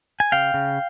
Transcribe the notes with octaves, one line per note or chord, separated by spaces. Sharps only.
G#5
C#3 F5 G5
C#3